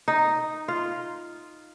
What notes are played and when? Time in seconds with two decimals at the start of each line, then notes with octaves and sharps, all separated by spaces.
0.08 D#4
0.68 F4